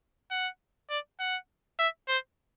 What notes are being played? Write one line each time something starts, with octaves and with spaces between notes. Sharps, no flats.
F#5
D5
F#5
E5
C5